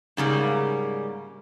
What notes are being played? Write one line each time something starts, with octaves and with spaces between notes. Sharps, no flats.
G#2 C#3 G3 A#3